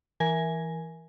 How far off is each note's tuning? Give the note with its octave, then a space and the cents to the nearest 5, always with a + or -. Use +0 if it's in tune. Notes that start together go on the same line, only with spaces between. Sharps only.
E3 +0 A#4 +15 G#5 +0